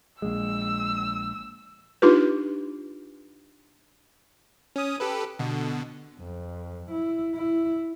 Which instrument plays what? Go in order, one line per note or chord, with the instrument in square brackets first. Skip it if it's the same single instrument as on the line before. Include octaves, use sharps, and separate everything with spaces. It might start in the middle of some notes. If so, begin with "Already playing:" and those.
[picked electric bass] A#1 G#3 [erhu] E6
[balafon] D4 D#4 F4 G4 B4
[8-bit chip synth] C#4 D#6
G4 A4 B4
B2 D3
[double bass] F2
E4
E4